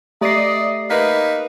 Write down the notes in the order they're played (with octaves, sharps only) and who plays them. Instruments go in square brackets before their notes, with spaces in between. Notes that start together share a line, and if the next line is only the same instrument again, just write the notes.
[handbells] A3 C7 [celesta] G4 [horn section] D5 D#5
[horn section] A#3 D#4 B4 [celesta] B6